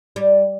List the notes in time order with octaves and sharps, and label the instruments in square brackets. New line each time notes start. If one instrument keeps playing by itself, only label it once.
[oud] G3